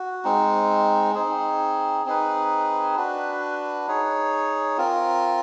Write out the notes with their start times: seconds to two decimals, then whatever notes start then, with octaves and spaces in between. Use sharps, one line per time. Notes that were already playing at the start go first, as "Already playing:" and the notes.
Already playing: F#4
0.24 G#3 C4 D#4
1.15 C4 D#4 G#4
2.05 C4 D#4 G#4 B4
2.97 D4 F#4 B4
3.87 D#4 G#4 C#5
4.78 C4 F4 A#4